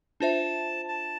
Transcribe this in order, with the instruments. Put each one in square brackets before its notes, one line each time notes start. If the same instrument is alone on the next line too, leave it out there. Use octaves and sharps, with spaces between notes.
[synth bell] D4 F4 C5 E5 [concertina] A5
[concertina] A5